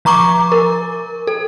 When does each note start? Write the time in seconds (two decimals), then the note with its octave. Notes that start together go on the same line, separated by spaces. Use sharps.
0.05 F3 A#5 C#6 D6
0.52 A#4
1.27 A4